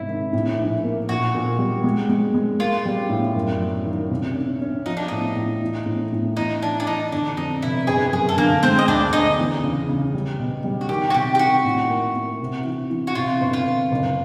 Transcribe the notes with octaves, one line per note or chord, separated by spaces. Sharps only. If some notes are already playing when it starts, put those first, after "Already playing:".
Already playing: G#2 C3 C#4 E4
D#3
A2
A#1
A#3
A#2 F#4
A#2
G3
G#3
G#3
G#3
A#3 F4
G3
A2
F#2
F#3
D#3
C2
C#4
C#4
F3 D#4
D4
A2 D#4
A2
E3
A2
A2
E3 D#4
E3 D4
D4
E3 D#4
D3 D4
F2 D#4
F1 E4
G1 G#4
F#2 G#4
A4
D3 A#3 A#4
G#3 C4 C5
D#5
D2 D4 D5
D2 D#4 D#5
E2
C#3
C#3
G3
B2
G3
F#4
D#3 G4
F#4
C3 G4
G4
D#3 F#4
A2
A#3
A#3
C3
E3
E3
F#4
C3 F4
G1
F4
G1
F#1